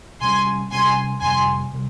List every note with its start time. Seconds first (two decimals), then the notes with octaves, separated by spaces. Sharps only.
0.21 C3 G3 C#4 G#5 C6
0.72 C3 G3 C#4 G#5 C6
1.21 F2 C3 G3 G#5 C6
1.73 C3 G3